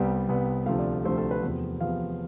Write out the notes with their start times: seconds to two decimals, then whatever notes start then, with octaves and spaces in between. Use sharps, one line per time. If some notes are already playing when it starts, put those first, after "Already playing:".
Already playing: C2 C3 G3 B3
0.29 C2 C3 G3 B3
0.66 D2 C3 F3 A3 F5
0.79 D5
1.05 D2 C3 F3 A3 C5
1.18 A4
1.31 B4
1.43 E2 C3 F3 B3
1.81 E2 C3 F3 B3 F5